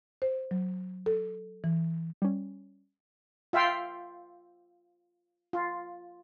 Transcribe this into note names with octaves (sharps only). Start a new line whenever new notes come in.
C5
F#3
A4
E3
G3 C#4
F4 E5 F5 G5 C6
F4